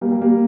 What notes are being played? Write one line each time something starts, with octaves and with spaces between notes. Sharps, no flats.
G3 A#3
G3 A#3
G3 A#3